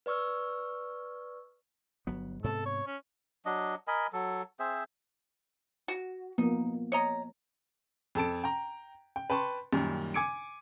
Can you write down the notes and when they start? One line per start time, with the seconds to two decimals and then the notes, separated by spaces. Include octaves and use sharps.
0.06 B4 D5 C#6 E6 F6
2.07 G1 F#3 B3
2.44 G#2 C3 B3 A4
2.66 C#5
2.87 C#4
3.45 F#3 D4 D#5
3.88 A#4 D#5 G#5 B5
4.13 F#3 A4
4.59 C4 G#4 C5 E5
5.88 F#4
6.38 F3 A#3 B3 D#4
6.92 C#5 D#5 A#5
8.15 F2 A4 A5 D7
8.44 G5 A#5
9.16 G5
9.30 B4 G5 A5 C6 C#6
9.73 F#2 A#2 D#3 G3
10.14 G#5 D6 G#6 C#7 D7